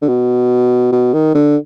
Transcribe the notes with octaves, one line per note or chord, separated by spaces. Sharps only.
D3
B2
B2
D#3
D3